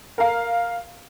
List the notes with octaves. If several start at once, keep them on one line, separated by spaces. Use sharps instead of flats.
A#4 F5